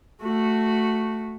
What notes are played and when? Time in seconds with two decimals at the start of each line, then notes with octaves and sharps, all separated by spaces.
0.21 A3 F#4